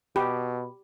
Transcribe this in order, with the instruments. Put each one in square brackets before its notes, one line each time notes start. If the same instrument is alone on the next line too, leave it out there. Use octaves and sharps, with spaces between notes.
[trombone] B2 [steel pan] G4 [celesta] B5